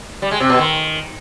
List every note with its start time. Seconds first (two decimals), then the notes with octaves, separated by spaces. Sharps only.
0.22 G3
0.31 G#3
0.40 C3
0.50 B2
0.59 D#3